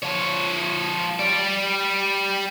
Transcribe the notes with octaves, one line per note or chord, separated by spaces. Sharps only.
F3 C#5
G3 D5